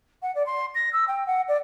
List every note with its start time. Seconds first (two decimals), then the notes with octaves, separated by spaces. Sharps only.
0.22 F#5
0.35 D5
0.46 C6
0.75 A#6
0.93 E6
1.07 G5
1.26 F#5
1.48 D5